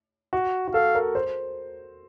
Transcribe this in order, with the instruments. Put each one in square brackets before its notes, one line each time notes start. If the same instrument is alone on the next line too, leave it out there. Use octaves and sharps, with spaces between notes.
[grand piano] F#4
F#4
[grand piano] A4 [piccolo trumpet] F5
[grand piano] A#4
C5